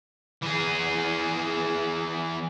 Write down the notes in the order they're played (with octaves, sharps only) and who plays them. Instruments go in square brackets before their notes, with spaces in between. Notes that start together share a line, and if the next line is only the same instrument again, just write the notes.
[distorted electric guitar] E3 G#4